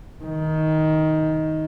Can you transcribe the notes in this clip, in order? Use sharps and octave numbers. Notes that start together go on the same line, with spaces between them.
D#3